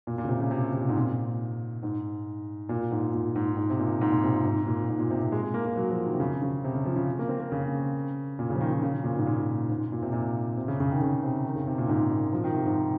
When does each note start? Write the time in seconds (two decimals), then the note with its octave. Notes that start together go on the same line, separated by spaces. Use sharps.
0.07 A#2
0.18 A#2
0.24 C#3
0.29 C3
0.40 C#3
0.51 C3
0.73 C3
0.81 A#2
0.89 G#2
0.96 A#2
1.83 G#2
2.69 A#2
2.91 G#2
3.14 A#2
3.36 G#2
3.57 G#2
3.70 C3
3.79 A#2
4.01 G#2
4.12 A#2
4.24 C3
4.34 A#2
4.45 G#2
4.67 A#2
4.88 G#2
4.99 A#2
5.11 C3
5.21 C3
5.32 G#3
5.43 G#3
5.54 A#3
5.65 A#3
5.76 F#3
5.91 F3
6.05 D#3
6.13 C3
6.20 C#3
6.42 C#3
6.64 C3
6.75 C#3
6.85 F3
6.96 C#3
7.19 A#3
7.29 C4
7.40 A#3
7.52 C#3
8.39 A#2
8.50 C#3
8.55 F3
8.61 D#3
8.72 D#3
8.83 C#3
9.04 A#2
9.18 G#2
9.26 A#2
9.70 G#2
9.92 A#2
10.02 C3
10.13 A#2
10.57 C3
10.68 C#3
10.80 C#3
10.91 D#3
11.01 C#3
11.23 C3
11.45 D#3
11.56 C#3
11.67 C3
11.78 A#2
11.89 G#2
12.11 A#2
12.33 F3
12.44 D#3
12.55 C3
12.66 G#2